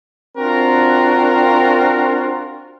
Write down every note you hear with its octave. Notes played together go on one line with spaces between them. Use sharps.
C4 D4 F4 F#4 A#4